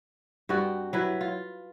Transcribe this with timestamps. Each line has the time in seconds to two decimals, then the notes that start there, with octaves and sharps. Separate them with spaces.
0.49 G2 C4 F#4
0.93 F#3 E4 B4
1.21 F4